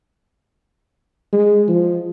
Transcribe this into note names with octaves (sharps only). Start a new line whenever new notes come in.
G#3
F3